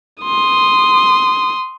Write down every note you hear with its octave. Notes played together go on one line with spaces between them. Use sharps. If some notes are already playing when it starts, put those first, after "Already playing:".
C6 D#6